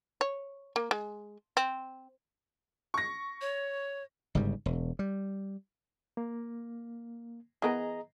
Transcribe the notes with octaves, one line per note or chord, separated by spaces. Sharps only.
C#5
A#3
G#3
C4
C#6 A#6
C#5
G1 G#2 C#3 G3
E1
G3
A#3
E3 B3 G#4 A#4 D#5 A#5